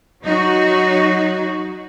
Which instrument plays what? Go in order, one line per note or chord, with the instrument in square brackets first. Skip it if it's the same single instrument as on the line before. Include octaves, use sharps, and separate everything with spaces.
[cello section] F#3 D#4 F#4